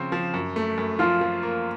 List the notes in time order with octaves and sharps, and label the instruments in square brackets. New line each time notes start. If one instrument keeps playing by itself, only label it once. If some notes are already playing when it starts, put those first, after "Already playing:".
Already playing: [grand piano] C#3 F3 C4
F3
F#2
A3
F#2
[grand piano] F3 [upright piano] F4
[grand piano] F3
A#3